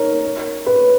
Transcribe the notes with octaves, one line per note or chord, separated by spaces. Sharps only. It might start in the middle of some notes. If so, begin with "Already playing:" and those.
Already playing: D#4 A#4 C#5
B4